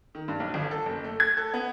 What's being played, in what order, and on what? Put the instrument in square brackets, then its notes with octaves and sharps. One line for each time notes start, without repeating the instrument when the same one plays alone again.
[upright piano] D#3
G2
B1
G1
A4
F#1
A3
G#6
A4
B3